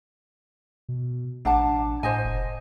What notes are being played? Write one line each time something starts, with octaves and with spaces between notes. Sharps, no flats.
B2
A1 D4 F#5 A5
A2 C5 D#5 G#5
F1